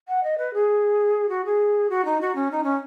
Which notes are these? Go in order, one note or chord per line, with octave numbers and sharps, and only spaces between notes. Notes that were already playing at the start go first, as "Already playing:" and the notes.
F#5
D#5
B4
G#4
F#4
G#4
F#4
D#4
F#4
C#4
D#4
C#4